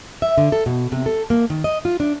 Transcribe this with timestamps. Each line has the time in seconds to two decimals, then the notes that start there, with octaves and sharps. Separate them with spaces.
0.22 E5
0.38 D3
0.52 A4
0.66 B2
0.92 C3
1.06 A4
1.30 A#3
1.50 D#3
1.64 D#5
1.85 F4
2.00 D4